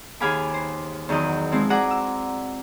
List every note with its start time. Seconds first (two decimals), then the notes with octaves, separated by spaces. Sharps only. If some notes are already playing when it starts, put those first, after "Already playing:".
0.20 D#2 G#4 F5 G#5 B5 D6
0.54 C5
1.09 E2 D#3 F#3 D#5 G6
1.52 F3 G#3 C4 E4
1.70 F#4 G#4 D5 F#5 A#5 D6
1.91 E6